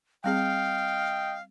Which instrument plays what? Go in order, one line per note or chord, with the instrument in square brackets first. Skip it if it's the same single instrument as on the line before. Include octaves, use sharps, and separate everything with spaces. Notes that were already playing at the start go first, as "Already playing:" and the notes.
[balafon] G3 C4 G#4 [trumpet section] D#5 G5 [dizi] F5